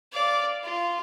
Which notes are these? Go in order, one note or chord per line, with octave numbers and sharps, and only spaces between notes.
D5 F5
F4